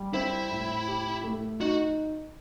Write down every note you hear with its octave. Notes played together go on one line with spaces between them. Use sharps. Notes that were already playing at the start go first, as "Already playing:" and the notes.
Already playing: G3
C4 E4
A2
G4
A3
D#4 F#4